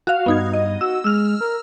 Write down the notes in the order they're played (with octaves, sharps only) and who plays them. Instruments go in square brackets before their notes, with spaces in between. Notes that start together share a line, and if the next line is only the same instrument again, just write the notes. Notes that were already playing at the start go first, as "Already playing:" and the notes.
[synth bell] F#4 F5
[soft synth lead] G2 [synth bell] B3 D#4 G#6
[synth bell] D#5
[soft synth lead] F#4 [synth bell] E6
[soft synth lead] G#3 [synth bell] E6 F6
[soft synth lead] A#4